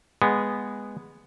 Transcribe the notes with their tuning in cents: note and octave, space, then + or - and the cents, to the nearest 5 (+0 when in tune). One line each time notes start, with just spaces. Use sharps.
G#3 -10 B3 +0